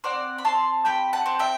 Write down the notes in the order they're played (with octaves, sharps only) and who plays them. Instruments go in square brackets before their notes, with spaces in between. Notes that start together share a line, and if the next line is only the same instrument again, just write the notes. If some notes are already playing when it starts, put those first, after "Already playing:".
[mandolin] C4 D5 F#5
B5
C4 A5 C6
G4 G5 B5
F#5 A5
C4
E5 G5